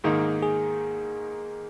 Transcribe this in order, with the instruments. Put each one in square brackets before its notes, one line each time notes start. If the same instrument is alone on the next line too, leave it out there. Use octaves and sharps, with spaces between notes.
[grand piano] G#2 D#3 A#3 D#4 [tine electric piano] G#4
[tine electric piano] G#4